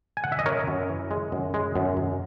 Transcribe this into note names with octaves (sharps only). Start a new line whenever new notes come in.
G#5
F#5
E5
D#5
F#2 A#4 C#5
F#2
E3
G#3
F#2
G#3
F#2
F#2